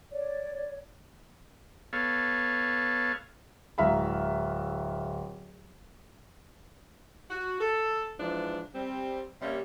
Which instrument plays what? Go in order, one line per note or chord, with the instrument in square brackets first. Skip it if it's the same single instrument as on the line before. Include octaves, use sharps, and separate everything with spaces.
[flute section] C#5 D5
[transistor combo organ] B3 A4 C#5 F5
[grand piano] D1 G#3 E5 F5 A#5 B5
[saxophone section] F#4
A4
G#2 E3 F3 D4
G3 C4
C3 G3 A#3 C#4